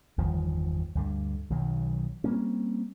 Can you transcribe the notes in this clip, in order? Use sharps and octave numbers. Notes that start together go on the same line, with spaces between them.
G1 E2 D#3 F3
D2 G2 D3
B1 D#3 F#3
G3 A#3 C4 C#4